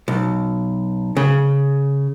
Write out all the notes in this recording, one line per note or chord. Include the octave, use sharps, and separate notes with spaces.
B1
C#3